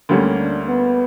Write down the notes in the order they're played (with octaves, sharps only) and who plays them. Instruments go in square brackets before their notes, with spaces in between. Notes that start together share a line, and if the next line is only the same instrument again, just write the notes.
[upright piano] D2 D3 G3 A#3 C#4
[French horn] D4
B3